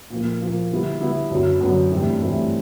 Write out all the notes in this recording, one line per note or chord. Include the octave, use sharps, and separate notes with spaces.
A#2 F3 A#3
A#2 F3 A#3
D3 G3 B3 E4
D3 G3 B3 E4
F#2 D3 F#3 B3
F#2 D3 F#3 B3
G2 E3 A3 C4 E4
G2 E3 A3 C4 E4